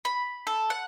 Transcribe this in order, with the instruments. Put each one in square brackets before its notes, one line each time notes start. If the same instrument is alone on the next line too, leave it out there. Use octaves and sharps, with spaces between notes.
[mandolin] B5
A4
F#5